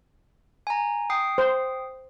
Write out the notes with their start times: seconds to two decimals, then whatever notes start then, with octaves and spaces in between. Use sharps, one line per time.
0.67 G#5 A#5
1.10 G5 D#6 C7
1.38 C5